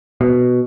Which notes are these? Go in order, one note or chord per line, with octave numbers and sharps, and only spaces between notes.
B2